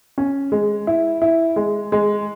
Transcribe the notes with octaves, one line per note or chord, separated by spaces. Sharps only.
C#4
G#3
E4
E4
G#3
G#3